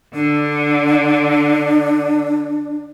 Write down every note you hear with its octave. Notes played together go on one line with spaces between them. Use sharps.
D3 D4